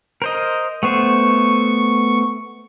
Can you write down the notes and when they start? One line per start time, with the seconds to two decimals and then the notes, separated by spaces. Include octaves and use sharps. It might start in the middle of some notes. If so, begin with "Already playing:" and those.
0.22 A#4 C5 D#5
0.83 A3 B3 C5 C#6